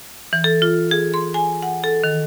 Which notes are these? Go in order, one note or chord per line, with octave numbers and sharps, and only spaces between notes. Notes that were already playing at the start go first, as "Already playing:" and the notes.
E3
A4
F4
G#4
C6
G#5
F#5
A4
D#3